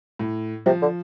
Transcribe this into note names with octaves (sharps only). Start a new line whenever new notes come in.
A2
C3 F3
D3